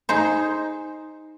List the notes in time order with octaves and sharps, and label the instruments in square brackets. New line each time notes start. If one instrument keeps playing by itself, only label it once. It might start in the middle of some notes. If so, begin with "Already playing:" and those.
[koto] D#4 G#4 C5